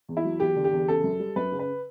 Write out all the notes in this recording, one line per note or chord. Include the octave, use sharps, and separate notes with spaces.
E2
E4
F#3
E2 G4
D3
G4
E2
C#3 A4
F#2
G3
F#2 B4
C#3
B4